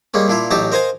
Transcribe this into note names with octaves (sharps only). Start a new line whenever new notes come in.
G3 G#3 A#3 C#4
A#2 D4 E4 F4
A1 F#3 D#4 G4 A5 A#5
A#4 C5 D#5 F5 G#5 A#5